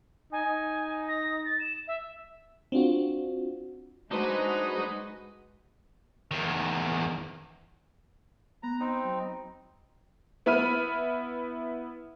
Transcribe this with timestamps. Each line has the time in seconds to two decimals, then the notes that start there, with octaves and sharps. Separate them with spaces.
0.32 D#4 G#5
1.08 A#6
1.46 A6
1.60 E7
1.88 E5
2.72 C4 D4 F4 F#4
4.11 G#3 D4 D#4 F#4 B4 C5 D#5 D#6
6.31 E2 D#3
8.63 B3 A#5
8.80 C4 D#4 D#5 G5 E6
9.04 F#3
10.46 B3 E4 B5 F6 D#7